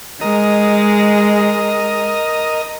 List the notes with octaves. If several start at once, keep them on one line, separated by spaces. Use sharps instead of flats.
G#3 A#4 D#5